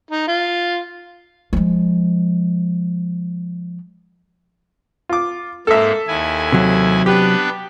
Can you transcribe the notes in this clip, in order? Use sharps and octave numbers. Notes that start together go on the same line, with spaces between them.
D#4
F4
F3 G#3
F4 D6
G#2 A#3 A4 E5
D#2 E4 G#5
C3 F#3
B3 D4 G4 B4